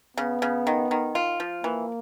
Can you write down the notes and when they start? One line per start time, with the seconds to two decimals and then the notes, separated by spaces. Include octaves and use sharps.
0.17 C#3 B3
0.42 C#3
0.67 D#3
0.91 D#3
1.15 F4
1.40 F3
1.64 E3 A#3